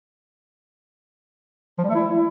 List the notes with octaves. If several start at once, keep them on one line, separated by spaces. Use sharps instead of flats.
F3
G3
A3
E4